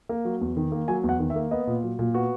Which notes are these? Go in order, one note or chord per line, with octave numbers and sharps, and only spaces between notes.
A#3
F#3
E2
D#3
A#3
F#3 G#5
E2
F#5
D#3
E5
A#3
B3 D#5
A#2
F#3
A#2
B3 F#4